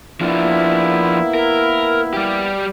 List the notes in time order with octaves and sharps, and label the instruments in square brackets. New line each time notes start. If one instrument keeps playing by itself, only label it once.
[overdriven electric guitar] F3 D4 [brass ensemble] A#3 B3 E4
[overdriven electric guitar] A#4
G3 G4